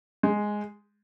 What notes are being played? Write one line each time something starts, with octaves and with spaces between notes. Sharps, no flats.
G#3